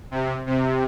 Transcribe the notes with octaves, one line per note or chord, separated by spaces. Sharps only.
C3
C3